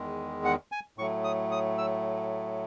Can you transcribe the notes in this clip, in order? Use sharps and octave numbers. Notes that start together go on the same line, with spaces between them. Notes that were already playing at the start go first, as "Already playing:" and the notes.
Already playing: E2 D#3 G#3
F#5
G#5
A2 F#3 A3 C#6
D#6
D#6
E6